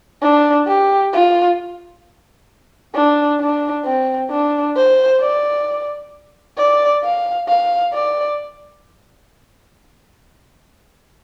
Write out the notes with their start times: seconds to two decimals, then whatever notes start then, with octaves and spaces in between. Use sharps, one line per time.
0.22 D4
0.67 G4
1.13 F4
2.94 D4
3.40 D4
3.85 C4
4.31 D4
4.77 C5
5.21 D5
6.58 D5
7.03 F5
7.48 F5
7.93 D5